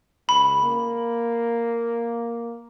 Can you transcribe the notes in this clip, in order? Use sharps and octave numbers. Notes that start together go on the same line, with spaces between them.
C#2 B5
A#3